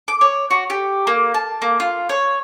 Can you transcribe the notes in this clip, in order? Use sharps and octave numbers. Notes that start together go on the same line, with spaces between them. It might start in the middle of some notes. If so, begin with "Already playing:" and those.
D6
C#5
F#4
G4
A#3
A5
A#3
F4
C#5